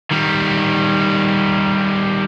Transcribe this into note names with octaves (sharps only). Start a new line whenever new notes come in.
D#3 G3